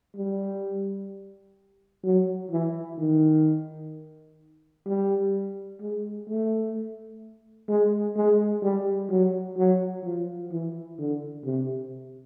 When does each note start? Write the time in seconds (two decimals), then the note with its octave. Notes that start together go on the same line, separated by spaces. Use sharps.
0.16 G3
2.03 F#3
2.51 E3
2.98 D#3
4.86 G3
5.81 G#3
6.28 A3
7.69 G#3
8.16 G#3
8.62 G3
9.10 F#3
9.57 F#3
10.04 F3
10.51 E3
10.99 D3
11.45 C3